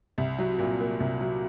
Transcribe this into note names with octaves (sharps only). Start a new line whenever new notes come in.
C2
F#3
A#2
A#3
C2
F#3